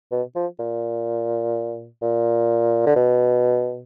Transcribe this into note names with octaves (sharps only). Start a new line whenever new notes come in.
B2
F3
A#2
A#2
D3
B2